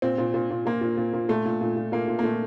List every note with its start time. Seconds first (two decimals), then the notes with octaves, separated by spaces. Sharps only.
0.02 A#2 C4
0.18 A#2
0.34 A#2
0.50 A#2
0.65 A#2 A#3
0.81 A#2
0.97 A#2
1.13 A#2
1.29 A#2 A3
1.45 A#2
1.61 A#2
1.76 A#2
1.92 A#2 A#3
2.08 A#2
2.19 A#3
2.23 A#2 A3